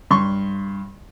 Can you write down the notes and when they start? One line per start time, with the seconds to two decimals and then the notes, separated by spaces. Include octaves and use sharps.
0.11 G2 C6 C#6